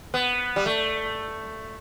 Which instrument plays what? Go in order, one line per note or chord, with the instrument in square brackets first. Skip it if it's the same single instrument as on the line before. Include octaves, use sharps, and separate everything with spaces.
[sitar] B3
G3
A3